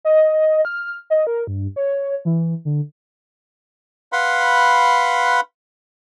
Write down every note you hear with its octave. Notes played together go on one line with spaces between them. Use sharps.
D#5
F6
D#5
A#4
G2
C#5
E3
D3
B4 F5 F#5 B5 C6